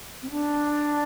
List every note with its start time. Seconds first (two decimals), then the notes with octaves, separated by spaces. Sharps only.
0.22 C4
0.30 D4